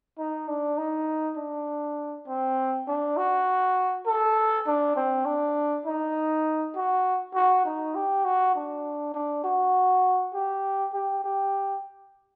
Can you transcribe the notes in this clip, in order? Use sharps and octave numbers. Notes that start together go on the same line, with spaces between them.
D#4
D4
D#4
D4
C4
D4
F#4
A4
D4
C4
D4
D#4
F#4
F#4
D#4
G4
F#4
D4
D4
F#4
G4
G4
G4